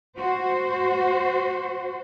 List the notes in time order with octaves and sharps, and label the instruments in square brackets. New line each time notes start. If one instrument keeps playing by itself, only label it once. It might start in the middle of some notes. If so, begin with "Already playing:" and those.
[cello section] F#4 C5